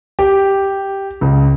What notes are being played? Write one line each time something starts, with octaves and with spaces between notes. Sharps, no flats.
G4
C#2